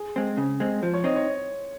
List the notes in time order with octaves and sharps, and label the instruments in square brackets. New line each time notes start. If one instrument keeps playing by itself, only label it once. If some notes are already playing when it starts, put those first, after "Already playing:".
Already playing: [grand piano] G#4
[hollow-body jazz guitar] G#3 C4
C#3
G#3 C4
[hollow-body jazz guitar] F3 [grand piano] C5
[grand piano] C#5
[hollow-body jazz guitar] C4 D#4 [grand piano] C#5
[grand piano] C#5